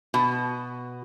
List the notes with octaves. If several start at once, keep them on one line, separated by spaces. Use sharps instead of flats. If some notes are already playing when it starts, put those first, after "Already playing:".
B2